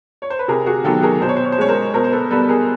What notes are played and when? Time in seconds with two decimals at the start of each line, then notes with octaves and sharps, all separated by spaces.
0.22 C#5
0.30 C5
0.39 B4
0.48 C3 G#4 A#4
0.66 F#4 G#4
0.84 D#3 F#3 B3 G4 A4
1.02 G#4 A#4
1.21 B2 C5
1.29 C#5
1.37 C5
1.45 C#5
1.52 C5
1.58 G#3 C#4 C#5
1.68 A#4 C5
1.94 B2 A#4 C5
2.04 C5
2.12 A4 B4
2.30 G3 B3 A4 B4
2.49 G#4 A#4